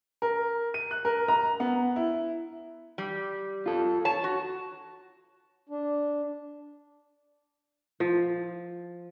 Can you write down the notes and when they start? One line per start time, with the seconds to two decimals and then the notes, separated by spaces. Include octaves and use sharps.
0.22 A#4
0.74 D#7
0.91 F#6
1.05 A#4
1.28 A#5
1.60 B3
1.96 E4
2.98 G3
3.66 F4 A4
4.05 C#5 A5
4.24 F#4
5.69 D4
8.00 F3